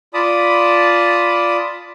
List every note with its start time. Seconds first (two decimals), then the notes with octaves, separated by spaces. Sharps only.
0.14 F4 D5 A5 B5 D#6